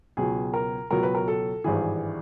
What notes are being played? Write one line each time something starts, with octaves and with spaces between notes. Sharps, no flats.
C#2 B2 F#3 G#4
A#4
C#2 B2 F#3 A#4
B4
A#4
A4
G#1 G2 E3 G#4